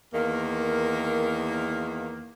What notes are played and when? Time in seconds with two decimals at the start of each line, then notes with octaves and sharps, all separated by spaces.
0.14 E2 D#3 A#3